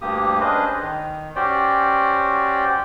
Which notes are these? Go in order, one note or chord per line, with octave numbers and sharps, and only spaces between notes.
D2 G2 A#3 G4 D#6
C#4 D4 G#4 B4 C5 D#5
D#3
C#4 F#4 G4 C5 D5 G5